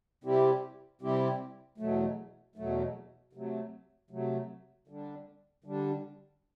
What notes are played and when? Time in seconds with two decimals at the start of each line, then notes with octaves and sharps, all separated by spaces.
0.24 C3 G3 C4 E4 G4
1.01 C3 G3 C4 E4 G4
1.78 E2 B2 F#3 A3
2.56 E2 B2 F#3 A3
3.33 C3 F#3 A3
4.10 C3 F#3 A3
4.88 D3 G3 D4
5.64 D3 G3 D4